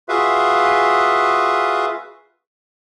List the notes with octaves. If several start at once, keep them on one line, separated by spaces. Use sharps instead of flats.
F4 F#4 G#4 B4 E5 F5